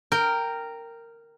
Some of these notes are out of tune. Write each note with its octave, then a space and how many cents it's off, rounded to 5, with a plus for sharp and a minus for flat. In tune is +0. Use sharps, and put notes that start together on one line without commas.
A#4 -10 G5 +0